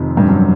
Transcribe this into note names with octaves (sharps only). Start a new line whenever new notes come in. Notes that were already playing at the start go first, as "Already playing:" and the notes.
Already playing: F1 F2 C3 D#3
G2
F#2